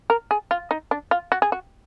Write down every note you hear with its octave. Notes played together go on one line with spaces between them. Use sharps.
A#4
G#4
F4
D#4
D4
F4
F#4
G#4
F#4